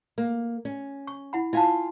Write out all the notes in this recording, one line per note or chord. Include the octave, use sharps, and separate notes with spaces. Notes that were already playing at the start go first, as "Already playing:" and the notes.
A#3
C#4
C#6
E4 F#5 B5
E4 F4 F5 G#5 A5